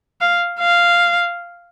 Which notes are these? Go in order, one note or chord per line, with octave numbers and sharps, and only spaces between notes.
F5
F5